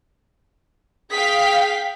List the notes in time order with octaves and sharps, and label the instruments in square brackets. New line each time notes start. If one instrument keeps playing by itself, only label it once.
[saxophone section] G#4 [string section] F5 G5 B6